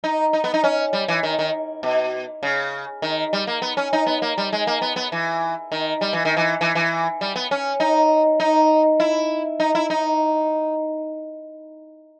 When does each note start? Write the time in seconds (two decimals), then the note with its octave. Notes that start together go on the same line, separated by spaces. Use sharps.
0.04 D#4
0.33 D#4
0.44 B3
0.54 D#4
0.64 C#4
0.93 G3
1.08 E3
1.23 D#3
1.39 D#3
1.83 B2
2.43 C#3
3.02 D#3
3.33 G3
3.47 A#3
3.62 B3
3.77 C#4
3.93 D#4
4.07 B3
4.22 A#3
4.38 G3
4.53 G#3
4.67 A#3
4.82 B3
4.96 B3
5.12 E3
5.72 D#3
6.01 G3
6.13 E3
6.25 D#3
6.37 E3
6.61 E3
6.75 E3
7.21 G3
7.36 B3
7.51 C#4
7.80 D#4
8.40 D#4
9.00 E4
9.60 D#4
9.75 E4
9.90 D#4